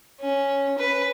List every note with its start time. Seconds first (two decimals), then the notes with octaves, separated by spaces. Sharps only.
0.20 C#4
0.78 B4